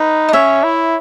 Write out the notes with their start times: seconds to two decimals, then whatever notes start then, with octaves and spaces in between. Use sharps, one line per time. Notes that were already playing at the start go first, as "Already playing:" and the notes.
Already playing: D#4 B4
0.29 D#5
0.33 C#4 C#5 E5
0.64 E4